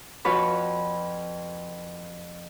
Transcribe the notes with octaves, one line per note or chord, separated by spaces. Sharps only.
F2 F4 F#4 B4 C#5 B5